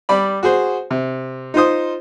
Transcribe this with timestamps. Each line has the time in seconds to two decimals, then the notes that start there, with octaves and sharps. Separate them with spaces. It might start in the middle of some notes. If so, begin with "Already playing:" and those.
0.09 G3 D5 B5
0.43 F#4 G#4 C5
0.91 C3
1.54 D#4 F4 C5 D#6